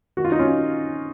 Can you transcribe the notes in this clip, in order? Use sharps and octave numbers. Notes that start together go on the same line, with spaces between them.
D#3 F#4
F4
D#4
C#4 F4